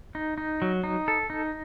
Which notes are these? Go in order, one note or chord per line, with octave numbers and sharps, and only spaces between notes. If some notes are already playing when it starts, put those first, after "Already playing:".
D#4
D#4
F#3
D#4
A4
D#4